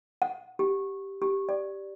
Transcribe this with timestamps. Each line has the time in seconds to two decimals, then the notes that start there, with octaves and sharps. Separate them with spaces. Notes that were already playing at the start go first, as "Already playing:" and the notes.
0.22 F#5
0.59 G4
1.22 G4
1.49 D5